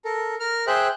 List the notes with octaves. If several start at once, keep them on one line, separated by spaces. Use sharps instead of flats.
A4 A#4
A#4 F6
G#4 C5 E5 G5 F#6